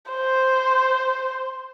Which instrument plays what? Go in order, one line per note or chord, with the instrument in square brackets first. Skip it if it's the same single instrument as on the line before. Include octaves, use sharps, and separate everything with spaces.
[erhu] C5